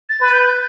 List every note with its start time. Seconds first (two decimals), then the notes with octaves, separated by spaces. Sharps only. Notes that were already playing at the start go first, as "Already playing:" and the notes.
0.09 A6
0.20 B4
0.32 G6
0.44 G6